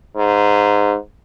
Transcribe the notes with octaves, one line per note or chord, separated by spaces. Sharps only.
G#2